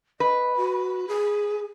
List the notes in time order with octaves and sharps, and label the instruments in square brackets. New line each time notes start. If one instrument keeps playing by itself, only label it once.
[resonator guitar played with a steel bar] B4 [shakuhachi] D#5
[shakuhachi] F#4
G#4